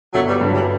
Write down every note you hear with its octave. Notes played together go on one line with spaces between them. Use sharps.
G1 F#3 A3
G3 B3
G2 D3 F#3
E3 G3